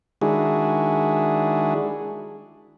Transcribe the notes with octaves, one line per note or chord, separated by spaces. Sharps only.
D#3 G#3 D4 E4 F#4 G#4